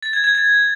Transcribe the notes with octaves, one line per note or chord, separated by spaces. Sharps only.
A6
G#6
G#6
A6